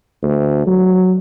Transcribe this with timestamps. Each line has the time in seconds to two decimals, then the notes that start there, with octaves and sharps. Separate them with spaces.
0.23 D2
0.67 F#3